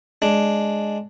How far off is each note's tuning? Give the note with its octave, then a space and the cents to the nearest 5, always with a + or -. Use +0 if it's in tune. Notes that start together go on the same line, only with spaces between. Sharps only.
G#3 +0 D4 +0